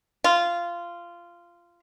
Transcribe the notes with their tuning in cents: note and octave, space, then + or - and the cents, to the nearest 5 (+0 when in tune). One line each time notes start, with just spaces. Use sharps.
F4 -15